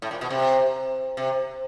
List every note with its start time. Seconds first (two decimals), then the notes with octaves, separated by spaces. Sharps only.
0.02 A2
0.11 A#2
0.21 B2
0.30 C3
1.17 C3